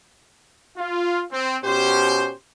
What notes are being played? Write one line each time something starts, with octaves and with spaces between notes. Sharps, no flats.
F4
C4
B2 C#4 G4 C5